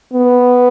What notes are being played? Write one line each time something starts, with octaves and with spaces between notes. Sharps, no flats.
B3